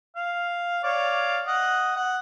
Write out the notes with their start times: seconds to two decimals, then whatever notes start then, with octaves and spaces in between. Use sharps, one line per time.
0.16 F5
0.84 C#5 D5 F5
1.47 D#5 F#5
1.96 F#5